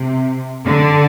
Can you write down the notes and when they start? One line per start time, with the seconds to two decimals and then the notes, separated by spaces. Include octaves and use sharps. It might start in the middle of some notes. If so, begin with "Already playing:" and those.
Already playing: C3
0.65 D3